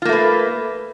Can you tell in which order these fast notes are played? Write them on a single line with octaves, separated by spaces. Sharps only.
F4 A#3 A3 B4